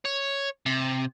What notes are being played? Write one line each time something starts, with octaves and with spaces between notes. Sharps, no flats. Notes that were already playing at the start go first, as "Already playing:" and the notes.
C#5
C3